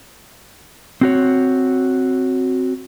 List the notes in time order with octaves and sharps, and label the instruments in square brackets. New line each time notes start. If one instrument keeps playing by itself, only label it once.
[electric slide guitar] C4 F#4 C#5